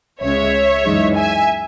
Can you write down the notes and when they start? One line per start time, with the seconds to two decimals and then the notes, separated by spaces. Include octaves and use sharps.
0.22 C#2 C#3 G#3 C#5 E5
0.84 F#2 E3 G#3 D#4
1.15 E5 G#5